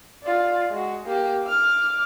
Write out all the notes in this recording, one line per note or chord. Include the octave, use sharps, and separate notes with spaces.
F4 D5
G#3 F#4
A#3 G4
D6 F6